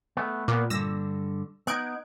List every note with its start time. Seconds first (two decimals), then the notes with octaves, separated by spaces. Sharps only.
0.17 A3 B3
0.48 A#2 A#3 B3
0.70 G2 D3 E6 A#6
1.67 B3 D#4 F#6 G#6 D7